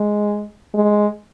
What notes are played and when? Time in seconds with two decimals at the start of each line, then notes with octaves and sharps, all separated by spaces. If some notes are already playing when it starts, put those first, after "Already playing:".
Already playing: G#3
0.74 G#3